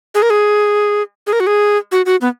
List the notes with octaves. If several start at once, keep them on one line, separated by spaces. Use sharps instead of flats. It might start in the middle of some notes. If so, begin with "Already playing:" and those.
G#4
A#4
G#4
G#4
A#4
F#4
G#4
F#4
F#4
B3